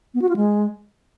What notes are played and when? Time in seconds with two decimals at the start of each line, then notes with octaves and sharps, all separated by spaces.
0.14 B3
0.22 F#4
0.29 F4
0.36 G#3